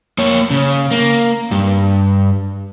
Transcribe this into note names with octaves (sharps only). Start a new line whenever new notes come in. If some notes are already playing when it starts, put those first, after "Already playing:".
A#3 C#5
C#3
A#3
G2